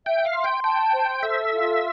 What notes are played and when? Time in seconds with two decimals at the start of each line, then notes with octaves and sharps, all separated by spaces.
0.06 E5 G5
0.25 F5
0.35 C6
0.44 G5
0.64 G5 A5
0.93 C5
1.22 A4 E5
1.52 F4